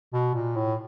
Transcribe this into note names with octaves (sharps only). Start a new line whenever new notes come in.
B2
A#2
A2